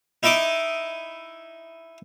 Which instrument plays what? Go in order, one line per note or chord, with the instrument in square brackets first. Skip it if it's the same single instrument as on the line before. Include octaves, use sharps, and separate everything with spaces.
[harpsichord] D#4 E4 D#5 D6